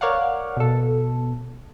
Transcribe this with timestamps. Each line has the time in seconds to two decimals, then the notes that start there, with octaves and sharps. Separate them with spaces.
0.01 A#4 C#5 D5 F5 F#5
0.57 B2 A4